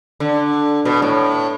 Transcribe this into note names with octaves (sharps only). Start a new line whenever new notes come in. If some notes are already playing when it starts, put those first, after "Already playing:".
D3
B2
A2